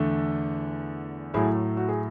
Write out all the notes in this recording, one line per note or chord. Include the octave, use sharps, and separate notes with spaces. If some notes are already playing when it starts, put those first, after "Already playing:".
Already playing: E2 D3 A3
A2 F#3 A3 E4 G#4
F#4
G#4